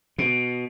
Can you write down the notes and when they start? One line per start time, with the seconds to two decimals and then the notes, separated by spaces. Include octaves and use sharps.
0.18 B2